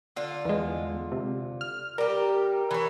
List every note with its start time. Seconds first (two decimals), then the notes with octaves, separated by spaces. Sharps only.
0.16 D3 F4
0.45 E2 G#3
1.12 C3
1.61 F6
1.98 G3 G4 A#4
2.71 E3 C#5